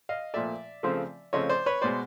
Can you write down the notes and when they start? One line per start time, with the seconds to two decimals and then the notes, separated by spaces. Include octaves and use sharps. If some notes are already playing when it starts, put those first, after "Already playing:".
0.09 D#5 F5
0.34 A#2 F3 A3 D5 E5
0.83 C#3 F3 A3 C4
1.33 C#3 F3 A3 C4 C#5 D#5
1.50 C5 D5
1.66 B4 C#5
1.82 B2 G#3 C5 D5